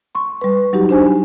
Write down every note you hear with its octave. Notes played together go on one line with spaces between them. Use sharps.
C6 C#6
G3 B4
F#3 G3 D#4 F#4 G4
D4 C5 G#5